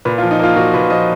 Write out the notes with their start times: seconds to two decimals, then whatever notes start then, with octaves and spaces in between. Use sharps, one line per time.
0.05 A#2 B4
0.18 F4
0.22 F3
0.31 D#4
0.39 A#3 F4
0.56 A#2 F#4
0.74 A#2 B4
0.90 F3 D#5